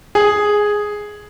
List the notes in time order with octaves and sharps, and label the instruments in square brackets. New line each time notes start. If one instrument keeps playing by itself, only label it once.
[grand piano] G#4